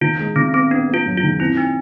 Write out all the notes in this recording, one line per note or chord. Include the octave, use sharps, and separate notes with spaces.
D#3 F4
G#3
D#3 C4
B3 C4
B3 D4
B3
F4
F#2
F4
D#3
C4 E4
D#4